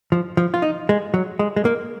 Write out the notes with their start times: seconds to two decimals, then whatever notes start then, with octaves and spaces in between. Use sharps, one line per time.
0.12 F3
0.37 F3
0.54 F4
0.62 D#4
0.89 G#3
1.14 F#3
1.39 G#3
1.56 G#3
1.65 A#3